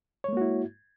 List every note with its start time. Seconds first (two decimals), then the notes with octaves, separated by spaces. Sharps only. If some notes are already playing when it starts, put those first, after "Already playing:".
0.24 C#5
0.28 G#3
0.33 A#3
0.37 F#4
0.41 E4